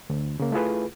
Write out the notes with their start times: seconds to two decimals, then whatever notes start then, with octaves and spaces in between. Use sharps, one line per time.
0.10 D2
0.40 C#3 A#3
0.52 A3 E4 F4 G#4 B4